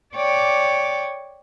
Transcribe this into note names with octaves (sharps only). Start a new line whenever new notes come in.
C#5 D5 G5 D6